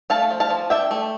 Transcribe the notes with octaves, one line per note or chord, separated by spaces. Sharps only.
A3 F5 A5
F3
F5 A5
F3
D4 E5 G5
A3